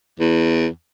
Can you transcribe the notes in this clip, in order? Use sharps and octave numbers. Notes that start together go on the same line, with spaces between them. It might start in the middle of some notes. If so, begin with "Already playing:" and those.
E2